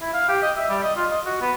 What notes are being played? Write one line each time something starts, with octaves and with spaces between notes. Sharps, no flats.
E4
F5
G4
D#5
E5
G3
D#5
F4
D#5
F#4
B3